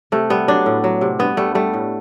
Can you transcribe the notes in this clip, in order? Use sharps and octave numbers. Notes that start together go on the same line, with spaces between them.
C3 A3
G3 B3
F#3 D4
A2
F#3
C3
G2 B3
G3 A3
G3 A3
A2